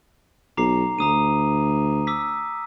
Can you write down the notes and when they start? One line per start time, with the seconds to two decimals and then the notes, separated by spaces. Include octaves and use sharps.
0.57 B1 A#5 D6 C7
0.98 D2 A#5 D#6 D#7
2.07 D6 E6 B6